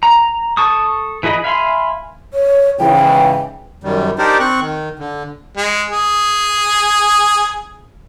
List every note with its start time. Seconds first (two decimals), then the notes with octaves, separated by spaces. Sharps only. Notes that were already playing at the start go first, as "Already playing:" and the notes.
0.03 A#5
0.57 A4 A5 C#6 D#6
1.23 E3 E4 G#4 D#5 B5
1.44 E5 F5 G#5 B5 C6
2.34 C#5
2.79 G#2 C#3 E3 G5
3.84 F#2 D#3 G3
4.18 D4 D#4 G4 A#4 C5 D5
4.40 C4 C#6 F#6
4.61 D#3
4.99 D3
5.57 G#3
5.91 G#4